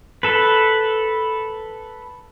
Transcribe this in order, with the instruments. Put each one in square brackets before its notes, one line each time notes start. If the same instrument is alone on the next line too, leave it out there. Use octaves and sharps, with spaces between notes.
[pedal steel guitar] A4 B4